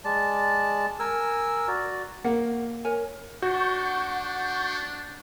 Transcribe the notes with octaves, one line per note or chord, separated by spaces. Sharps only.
G#3 D5 A5
A#4 G#5 E6
F#4 D5
A#3 F#5
A#4 C#5 G#5
D4 F#4 F#5 C#6 G6